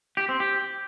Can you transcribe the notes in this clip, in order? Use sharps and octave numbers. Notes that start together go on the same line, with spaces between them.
G4
C4
G4